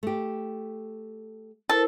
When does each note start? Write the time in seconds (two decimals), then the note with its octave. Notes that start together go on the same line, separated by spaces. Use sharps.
0.03 A3 G4
1.69 E4 A4 A#4 C5